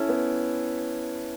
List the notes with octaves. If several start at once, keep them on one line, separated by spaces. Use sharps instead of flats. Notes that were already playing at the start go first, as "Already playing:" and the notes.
Already playing: C#4 E4 A4
B3